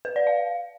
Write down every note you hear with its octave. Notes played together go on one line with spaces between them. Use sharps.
B4
D5
F5